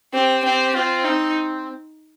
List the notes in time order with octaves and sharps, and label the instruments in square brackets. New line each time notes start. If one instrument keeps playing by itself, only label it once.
[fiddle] C4 [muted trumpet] G4
[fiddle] C4
[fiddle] C4 [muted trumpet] F4
[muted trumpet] C4 [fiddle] D#4